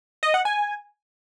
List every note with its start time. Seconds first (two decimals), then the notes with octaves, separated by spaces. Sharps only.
0.23 D#5
0.34 F#5
0.45 G#5